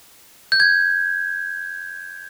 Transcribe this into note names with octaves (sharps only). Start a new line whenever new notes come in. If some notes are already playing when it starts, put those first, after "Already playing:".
G6
G#6